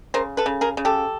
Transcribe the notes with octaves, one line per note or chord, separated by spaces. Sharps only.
C#3 A#4 C5
A4 B4
C#3
G#4 A#4
C#3
G4 A4